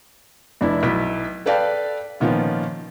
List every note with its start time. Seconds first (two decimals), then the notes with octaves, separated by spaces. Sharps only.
0.61 F1 D4 E4
0.83 B1 E4 B6
1.46 A4 B4 D5 F5 G5 A5
2.20 A#2 D#3 F3 B3 C#4 F4